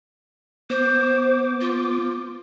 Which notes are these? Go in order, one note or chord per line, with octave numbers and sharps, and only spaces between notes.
B3 C5 D6
F4